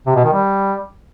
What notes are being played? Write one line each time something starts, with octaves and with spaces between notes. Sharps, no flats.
C3
B2
D#3
G3